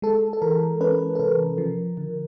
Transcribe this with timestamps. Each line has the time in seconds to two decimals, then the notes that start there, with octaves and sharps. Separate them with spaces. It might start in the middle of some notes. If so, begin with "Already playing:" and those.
0.02 G#3 A4
0.33 A4
0.42 E3 A#4
0.81 C#4 B4
1.15 A4
1.19 C3 A#4
1.58 F3
1.97 D3